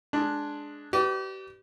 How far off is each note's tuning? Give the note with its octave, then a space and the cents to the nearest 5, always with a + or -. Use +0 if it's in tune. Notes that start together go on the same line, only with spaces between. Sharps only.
G#3 +10 D4 +0
G4 -35 B4 +15 D5 +15